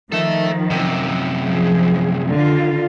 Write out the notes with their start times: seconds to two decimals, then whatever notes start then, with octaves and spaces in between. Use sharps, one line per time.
0.12 D#3 F3 A4 E5
0.70 F#2 C3
1.41 F3 G#4
2.31 D3 D#3 F4